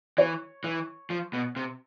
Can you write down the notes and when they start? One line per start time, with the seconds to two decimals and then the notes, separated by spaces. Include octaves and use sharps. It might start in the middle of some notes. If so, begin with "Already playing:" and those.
0.18 E3 C#5
0.64 E3
1.10 F3
1.33 B2
1.56 C3